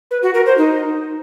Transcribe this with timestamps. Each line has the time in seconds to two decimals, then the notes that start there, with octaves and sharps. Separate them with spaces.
0.11 B4
0.23 F#4
0.34 A#4
0.46 C5
0.58 D#4